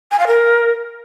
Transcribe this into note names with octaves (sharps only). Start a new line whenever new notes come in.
G#5
F5
A#4